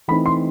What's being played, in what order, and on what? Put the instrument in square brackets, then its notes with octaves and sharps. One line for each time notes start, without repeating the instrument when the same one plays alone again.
[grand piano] E3 A3 C4 D#4 B5
C6